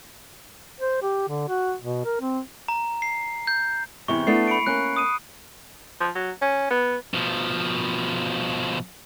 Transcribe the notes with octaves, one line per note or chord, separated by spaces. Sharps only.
C5
G4
D3
F#4
B2
A#4
C4
A#5
C7
G6
E2 C3 C#6
A3 B3 D4 C7
B5 C#7 D7
A#3 C#4 F#6
D#6 D#7
F3
F#3
C#4
B3
B2 F3